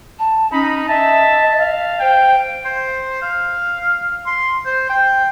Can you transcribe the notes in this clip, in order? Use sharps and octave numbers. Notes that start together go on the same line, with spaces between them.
A5
C#4 D#4 B5
D#5 E5 A5
F5
C5 G5
C5
F5
C6
C5
G5